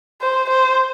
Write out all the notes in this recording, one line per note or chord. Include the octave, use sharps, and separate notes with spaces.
C5
C5